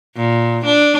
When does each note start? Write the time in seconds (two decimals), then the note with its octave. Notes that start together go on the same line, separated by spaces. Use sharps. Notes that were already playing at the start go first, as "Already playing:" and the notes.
0.16 A#2
0.66 D4